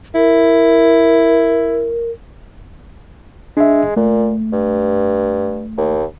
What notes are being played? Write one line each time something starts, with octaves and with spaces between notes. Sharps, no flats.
E4 A#4
G#3 D4 E5
A#2 A3
G2
D#2